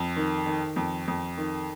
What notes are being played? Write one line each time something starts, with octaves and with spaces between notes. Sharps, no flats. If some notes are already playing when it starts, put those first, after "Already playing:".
Already playing: F2
D#3
D#3
F2
F2
D#3